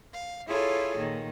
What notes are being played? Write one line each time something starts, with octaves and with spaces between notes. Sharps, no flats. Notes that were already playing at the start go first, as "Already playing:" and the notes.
F5
E4 F4 G#4 A4 C#5
A#2 D#3